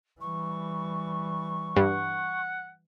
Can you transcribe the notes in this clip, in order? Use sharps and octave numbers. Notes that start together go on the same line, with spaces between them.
E3 G3 C#6
G2 F#5